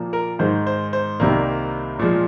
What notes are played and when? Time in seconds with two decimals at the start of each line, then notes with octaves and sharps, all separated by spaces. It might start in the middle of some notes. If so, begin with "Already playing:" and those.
Already playing: A#2 F3 A#3
0.13 A#4
0.39 G#2 D#3 G#3 C5
0.67 C5
0.93 C5
1.20 C2 C3 D#3 G3 A#3
1.99 A#2 F3 G#3